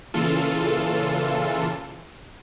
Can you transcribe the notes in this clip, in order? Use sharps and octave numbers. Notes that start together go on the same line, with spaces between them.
A#2 C#3 E3 F4 A4